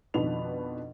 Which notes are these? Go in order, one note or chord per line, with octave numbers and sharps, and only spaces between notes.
F2 B2 D#3 D4 B4 F7